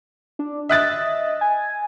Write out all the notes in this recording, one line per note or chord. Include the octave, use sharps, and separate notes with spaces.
D4
D#5 E5 F#6 A6
G#5